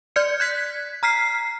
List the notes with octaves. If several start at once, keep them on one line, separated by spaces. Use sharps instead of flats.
D5 F6 G6 G#6 C#7
F#6 G#6 B6
A#5 F6 B6 C7